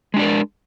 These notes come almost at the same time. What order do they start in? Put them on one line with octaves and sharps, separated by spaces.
G#3 D4 D5 A#4